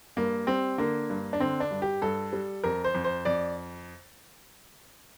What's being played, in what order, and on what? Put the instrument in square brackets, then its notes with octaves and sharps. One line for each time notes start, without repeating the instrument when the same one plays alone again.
[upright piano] G2 A#3
G3 C4
D3 A#3
G2
D4
D3 C4
D4
G2
G4
G2 A4
G3
F2 A#4
C5
F2
C5
F2 D5